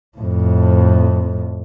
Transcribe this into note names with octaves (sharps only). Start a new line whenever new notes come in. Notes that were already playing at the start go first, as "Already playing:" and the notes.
F2 A2